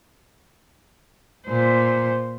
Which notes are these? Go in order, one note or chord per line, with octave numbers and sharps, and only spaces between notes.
A#2 C5